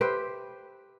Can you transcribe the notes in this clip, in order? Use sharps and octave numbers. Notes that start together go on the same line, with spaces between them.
G4 B4 C5 E5